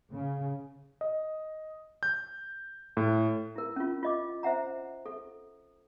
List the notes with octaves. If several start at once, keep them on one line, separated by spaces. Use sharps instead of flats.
C#3
D#5
G6
A2
E4 A#4
C#4 F4
F4 D#5 D6
C5 E5 F#5 A#5
A4